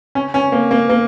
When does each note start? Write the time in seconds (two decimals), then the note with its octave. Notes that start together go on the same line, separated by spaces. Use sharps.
0.15 C#4
0.34 C#4
0.52 A#3
0.71 A#3
0.89 A#3